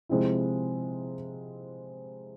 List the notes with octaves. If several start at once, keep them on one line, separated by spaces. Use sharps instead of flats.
C3 F3 G#3 C4 E4